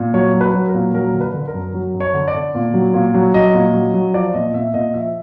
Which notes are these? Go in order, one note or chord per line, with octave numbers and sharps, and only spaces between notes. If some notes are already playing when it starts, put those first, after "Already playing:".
Already playing: A#2
F#3 C#5
F#3
B4
F#3
A#4
A#2
F#3 A#4
D3
B4
D3
A#4
F#2
F#3
F#2
C#5
D3
D5
D3
A#2
F#3
A#2
F#3
F#3 D#5
A#2
F#3
F#3
F3 D5
A#2 D#5
A#2 E5
A#2 D#5
F3 E5